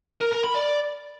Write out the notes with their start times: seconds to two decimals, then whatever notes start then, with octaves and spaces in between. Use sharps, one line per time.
0.21 A#4
0.32 A#4
0.43 B5
0.55 D5